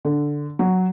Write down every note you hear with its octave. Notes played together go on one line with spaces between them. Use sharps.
D3
F#3